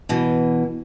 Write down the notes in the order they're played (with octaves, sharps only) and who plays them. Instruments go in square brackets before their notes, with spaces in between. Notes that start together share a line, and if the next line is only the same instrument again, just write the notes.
[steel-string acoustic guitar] B2 E3